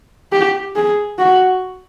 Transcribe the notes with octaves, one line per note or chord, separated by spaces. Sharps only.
G4
G#4
F#4